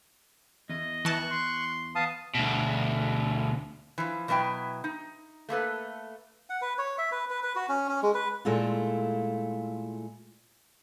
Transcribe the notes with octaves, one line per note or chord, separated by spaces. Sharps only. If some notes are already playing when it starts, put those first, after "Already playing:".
E2 D#5
E3 A5 C#6 F#6
C6
B3 F5 A5 D#6
D2 B2
E3 F3
B2 F#3 B3 E4 G5
D#4
A3 A#3 A4 B4
F#5
B4
C#5
E5
B4
B4
B4
F#4
C#4
C#4
G#3
B4
A#2 G#3 A3 E4 F4